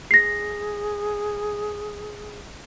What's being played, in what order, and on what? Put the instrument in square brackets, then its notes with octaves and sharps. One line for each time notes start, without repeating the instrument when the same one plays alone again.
[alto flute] G#4 [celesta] A#6 C7